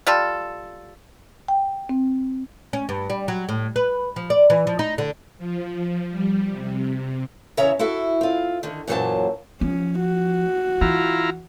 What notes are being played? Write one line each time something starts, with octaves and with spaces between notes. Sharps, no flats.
G3 F4 A4
G5
C4
C#4
G2
G3
F#3
A2
B4
F3
D5
E3
F3
D#4
D3
F3
G3
C3
E2 C#3 C#5 E5 A#5
E4 F#4 A4 E5
C4 F4
D3 D#3
F#2 A#2 E3 F#3 C5 A5
F3 C#4
F#4
E3 E4 F4 A#5